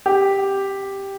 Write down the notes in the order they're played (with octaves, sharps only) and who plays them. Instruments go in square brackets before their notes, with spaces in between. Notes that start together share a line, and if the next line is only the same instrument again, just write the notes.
[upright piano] G4